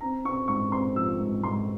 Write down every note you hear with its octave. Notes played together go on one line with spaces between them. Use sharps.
C4 A#5
C4 C#6
G#2 C#6
C4 C6
F3 E6
G#2
G#2 C6